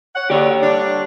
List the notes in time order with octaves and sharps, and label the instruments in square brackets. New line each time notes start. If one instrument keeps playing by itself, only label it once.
[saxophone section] C#5 F#5
[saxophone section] D3 [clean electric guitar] G4 C#5
[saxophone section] D3 G3 D4